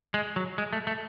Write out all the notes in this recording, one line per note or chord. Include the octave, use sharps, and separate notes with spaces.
G#3
F#3
G#3
A3
A3